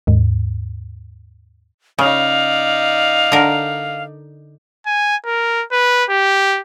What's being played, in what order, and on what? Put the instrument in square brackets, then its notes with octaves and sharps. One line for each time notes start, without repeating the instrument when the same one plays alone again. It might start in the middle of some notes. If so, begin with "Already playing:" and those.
[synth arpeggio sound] D#2 G#2
[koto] C#3 [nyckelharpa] D#4 D5 [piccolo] F5
[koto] D3 A#4
[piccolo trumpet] G#5
A#4
B4
G4